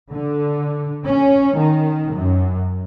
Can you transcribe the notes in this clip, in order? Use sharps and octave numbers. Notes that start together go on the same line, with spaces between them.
D3
C#4
D#3
F#2